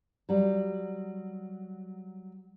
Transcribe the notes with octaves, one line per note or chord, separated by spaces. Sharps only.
F#3 G3